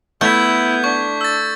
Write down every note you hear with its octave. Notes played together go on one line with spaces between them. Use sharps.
A3 B3 E4 G6 G#6 B6
D4 C#6
E6 A6